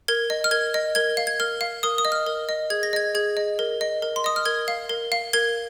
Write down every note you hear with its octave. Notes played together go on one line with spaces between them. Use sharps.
A#4 G#6
D#5
F6
A#4 G#6
D#5
A#4 G#6
F5
G#6
A#4 F6
F5
A#4 D#6
D#6
D#5
F6
A#4
D#5
G#4 G#6
A#6
D#5 G#6
G#4 G#6
D#5
A#4
D#5
A#4
C6
D#5 D#6
F6
A#4 G#6
F5
A#4
F5
A#4 G#6